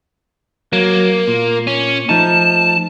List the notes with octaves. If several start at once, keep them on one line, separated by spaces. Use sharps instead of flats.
F#3 A#3
A#2
C#4
F3 A3 D#4 A5